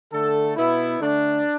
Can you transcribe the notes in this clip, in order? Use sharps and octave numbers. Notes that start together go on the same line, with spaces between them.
D3 A3 A4
B2 B3 E4
D3 A3 D4